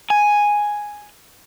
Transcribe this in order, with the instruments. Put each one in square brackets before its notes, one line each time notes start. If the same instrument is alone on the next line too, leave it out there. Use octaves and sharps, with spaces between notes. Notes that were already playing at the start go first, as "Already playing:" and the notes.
[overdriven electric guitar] G#5